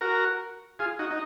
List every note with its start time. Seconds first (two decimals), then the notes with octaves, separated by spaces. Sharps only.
0.01 F#4 A#4
0.79 F4 G#4
0.99 D#4 F#4
1.10 D#4